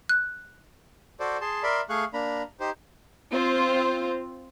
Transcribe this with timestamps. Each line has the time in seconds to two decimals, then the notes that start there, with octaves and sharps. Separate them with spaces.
0.09 F#6
1.20 F#4 A4 C5 D5
1.41 G#4 A5 C6
1.63 A#4 D5 E5 B5 C6
1.89 A3 G#4 F5 C#6 F#6
2.13 A#3 D4 A#5 B5
2.60 D#4 G4 C5
3.32 C4 F4 C5